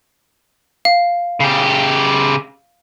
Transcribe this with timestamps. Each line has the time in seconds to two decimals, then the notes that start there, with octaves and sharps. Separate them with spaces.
0.85 F5
1.40 C#3 G4